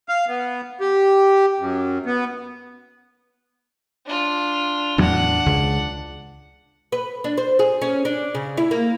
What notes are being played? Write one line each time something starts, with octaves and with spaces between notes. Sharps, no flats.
F5
B3
G4
F#2
B3
D4 F4
E2 A2 F#3 D4 F#5
C#2
B4
D4
C5
G#4
C#4
D4
C#3
E4
A#3